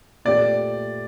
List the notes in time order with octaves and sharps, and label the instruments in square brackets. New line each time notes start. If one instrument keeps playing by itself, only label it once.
[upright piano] A#2 A3 C4 G4 [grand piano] D5